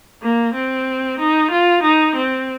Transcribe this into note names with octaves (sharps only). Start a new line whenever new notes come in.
A#3
C4
D#4
F4
D#4
C4